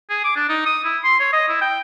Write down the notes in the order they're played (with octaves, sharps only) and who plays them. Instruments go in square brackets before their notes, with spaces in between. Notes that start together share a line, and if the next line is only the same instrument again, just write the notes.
[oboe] G#4
D6
D4
D#4
D#6
E4
C6
C#5
D#5
E4
G5